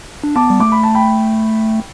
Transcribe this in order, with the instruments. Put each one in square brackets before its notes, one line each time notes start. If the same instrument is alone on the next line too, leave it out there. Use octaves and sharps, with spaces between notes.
[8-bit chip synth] D4
[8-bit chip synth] B3 [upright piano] A5 D6
[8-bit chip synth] G3
[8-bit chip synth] A3 [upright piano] D6
[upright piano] B5
A5
G5 B5